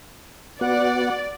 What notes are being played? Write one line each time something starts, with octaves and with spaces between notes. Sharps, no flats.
B3 F#4 D5 F#5